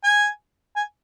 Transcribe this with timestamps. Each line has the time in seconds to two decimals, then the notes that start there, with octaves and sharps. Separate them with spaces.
0.04 G#5
0.76 G#5